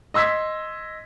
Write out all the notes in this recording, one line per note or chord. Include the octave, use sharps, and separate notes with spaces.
D#5 C6 E6 G#6 B6